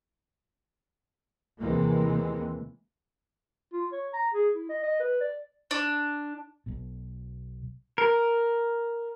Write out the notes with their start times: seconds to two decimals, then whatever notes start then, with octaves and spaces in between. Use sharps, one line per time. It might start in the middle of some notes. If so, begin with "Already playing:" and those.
1.59 D#2 C3 E3 G#3 A#3
3.73 F4
3.92 C#5
4.13 A#5
4.34 G#4
4.55 E4
4.69 D#5
4.83 D#5
5.00 B4
5.20 D5
5.71 D4
6.66 B1 B2
7.98 A#4